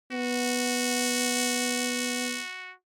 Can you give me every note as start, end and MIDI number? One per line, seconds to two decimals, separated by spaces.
0.12 2.42 59
0.12 2.73 66